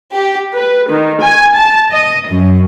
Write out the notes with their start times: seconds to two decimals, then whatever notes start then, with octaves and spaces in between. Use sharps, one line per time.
0.15 G4
0.53 B4
0.89 D#3
1.19 G#5
1.55 A5
1.92 D#5
2.29 F#2